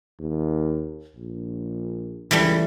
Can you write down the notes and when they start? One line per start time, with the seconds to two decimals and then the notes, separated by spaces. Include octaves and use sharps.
0.20 D#2
1.16 A#1
2.31 C#2 E3 G3 A3